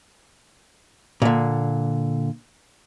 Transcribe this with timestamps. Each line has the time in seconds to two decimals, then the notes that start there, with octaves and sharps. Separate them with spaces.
1.22 A#2 D3